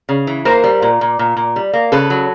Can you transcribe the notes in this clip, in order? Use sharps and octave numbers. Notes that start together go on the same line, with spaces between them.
C#3
E3
A#3 A#4 C5
G3
A#2
A#2
A#2
A#2
G3
A#3
C#3 A4 B4
F#3